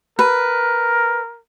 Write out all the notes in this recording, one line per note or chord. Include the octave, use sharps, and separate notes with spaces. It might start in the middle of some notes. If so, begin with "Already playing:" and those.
A#4 B4